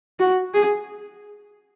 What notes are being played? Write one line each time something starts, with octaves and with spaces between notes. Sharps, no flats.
F#4
G#4